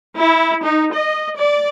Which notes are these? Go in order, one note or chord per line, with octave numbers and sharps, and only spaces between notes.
E4
D#4
D#5
D5